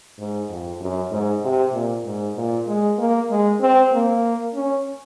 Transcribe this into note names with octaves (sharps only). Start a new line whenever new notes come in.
G#2
F2
F#2
G#2
C3
A#2
G#2
A#2
G#3
A#3
G#3
C4
A#3
C#4